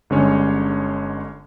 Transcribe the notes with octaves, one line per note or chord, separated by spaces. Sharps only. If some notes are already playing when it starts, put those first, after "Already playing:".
G1 D3 G3 G#3 C#4 C#5